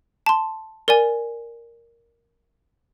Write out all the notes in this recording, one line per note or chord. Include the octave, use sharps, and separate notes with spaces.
A5 C6
A#4 D5 G#5